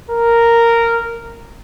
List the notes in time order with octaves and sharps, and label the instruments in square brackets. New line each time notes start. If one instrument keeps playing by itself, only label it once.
[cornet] A#4